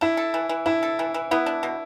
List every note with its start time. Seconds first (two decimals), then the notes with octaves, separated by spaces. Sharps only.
0.01 D4 E4
0.17 A4
0.34 E3
0.49 E3
0.66 D4 E4
0.83 A4
0.99 E3
1.14 E3
1.31 B3 E4
1.46 D4
1.63 B2